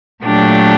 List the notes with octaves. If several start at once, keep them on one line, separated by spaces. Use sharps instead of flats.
A#2 F#3 A3 D4 G4